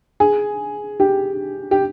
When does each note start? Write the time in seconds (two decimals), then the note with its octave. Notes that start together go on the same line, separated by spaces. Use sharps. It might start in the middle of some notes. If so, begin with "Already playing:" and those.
0.20 G#4
1.00 G4
1.71 G4